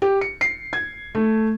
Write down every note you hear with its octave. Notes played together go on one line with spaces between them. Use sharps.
G4
C#7
C7
G#6
A3